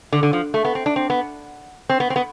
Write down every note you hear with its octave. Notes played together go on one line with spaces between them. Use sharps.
D3
D3
F3
A3
B3
C4
D4
C4
B3
C4
B3
C4
B3